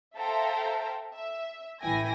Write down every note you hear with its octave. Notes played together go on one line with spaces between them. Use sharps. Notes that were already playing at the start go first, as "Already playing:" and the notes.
A4 C5 E5 F5 G5 A#5
E5
A1 E3 E4 G5 G#5 A#6